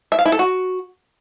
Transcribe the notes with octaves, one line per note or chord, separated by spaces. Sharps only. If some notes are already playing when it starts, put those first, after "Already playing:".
E5
F5
E4
A4
F#4